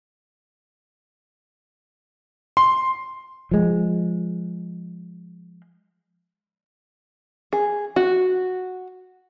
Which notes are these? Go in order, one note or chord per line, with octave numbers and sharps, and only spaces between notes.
C6
F3 G#3
G#4
F#4